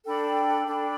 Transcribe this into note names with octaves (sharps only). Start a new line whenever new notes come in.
D4 A4 G5 B5
D4 A4 G5 B5